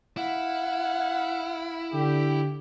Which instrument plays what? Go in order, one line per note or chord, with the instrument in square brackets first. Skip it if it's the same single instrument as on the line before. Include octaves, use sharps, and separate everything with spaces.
[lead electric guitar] E4 [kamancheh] F5 F#5
[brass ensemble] D3 G4